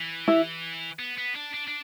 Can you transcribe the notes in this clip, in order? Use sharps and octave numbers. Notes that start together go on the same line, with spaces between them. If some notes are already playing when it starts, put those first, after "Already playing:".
Already playing: E3
E4
B3
B3
D4
D4
D4